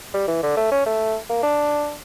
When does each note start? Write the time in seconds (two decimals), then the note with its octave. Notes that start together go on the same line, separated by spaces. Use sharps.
0.14 G3
0.28 E3
0.43 D3
0.57 A3
0.72 C#4
0.86 A3
1.29 A#3
1.43 D4